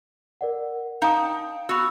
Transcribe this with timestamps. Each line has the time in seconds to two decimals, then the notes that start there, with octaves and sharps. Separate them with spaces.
0.41 A#4 D5 F#5
1.02 D#4 F5 G5 A5 D#6
1.69 B3 F#4 B5 C#6 E6